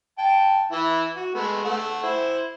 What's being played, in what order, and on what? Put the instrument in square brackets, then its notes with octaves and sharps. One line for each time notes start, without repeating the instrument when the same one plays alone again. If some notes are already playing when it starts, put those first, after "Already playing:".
[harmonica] G5 A5
E3 E4
F#4
G#3 A3 B3
A3 F#5
E4 C5